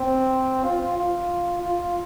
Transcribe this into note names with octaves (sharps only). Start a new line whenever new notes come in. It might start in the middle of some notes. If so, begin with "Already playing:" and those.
Already playing: C4
F4
F4
F4